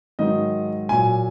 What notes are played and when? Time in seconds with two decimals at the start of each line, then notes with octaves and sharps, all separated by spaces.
0.19 G#2 D#3 F#3 D#5
0.89 A#2 F#3 G#5